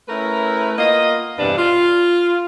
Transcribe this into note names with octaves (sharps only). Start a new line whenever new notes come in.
A3 C#4 E4 A#4 B4
A#3 B3 F4 D#5
E2 G2 C3 D4 B4
F4